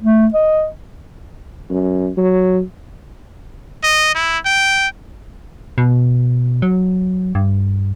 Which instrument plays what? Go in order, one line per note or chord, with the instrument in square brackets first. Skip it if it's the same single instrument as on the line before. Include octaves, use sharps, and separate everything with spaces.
[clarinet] A3
D#5
[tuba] F#2
F#3
[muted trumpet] D#5
E4
G5
[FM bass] B2
F#3
G2